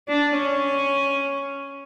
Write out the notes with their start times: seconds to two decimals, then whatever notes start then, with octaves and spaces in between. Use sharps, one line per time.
0.08 D4
0.36 C#4